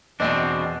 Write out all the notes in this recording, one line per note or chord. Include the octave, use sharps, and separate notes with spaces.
E2 B2 C4 D4 D5 D#5